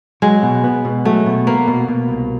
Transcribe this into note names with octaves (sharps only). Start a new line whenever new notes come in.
F#3 G#3
B2
B3
B2
F#3 A3
B2
A#3 B3
B2
B2
C2